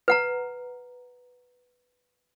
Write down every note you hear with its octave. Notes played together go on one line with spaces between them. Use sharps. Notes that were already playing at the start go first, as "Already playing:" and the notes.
B4 F#5 A#5